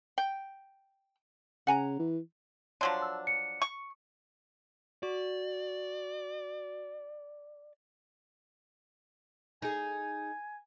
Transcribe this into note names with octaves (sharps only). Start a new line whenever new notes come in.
G5
C#3 F#5 G#5 A#5
E3
F3 F#3 D4 C6
E6
C#7
C#6
F#4 D5
D#4 G#4 G#5